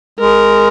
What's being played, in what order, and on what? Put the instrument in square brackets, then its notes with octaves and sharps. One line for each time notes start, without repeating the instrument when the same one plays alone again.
[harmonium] G#3 [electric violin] A#4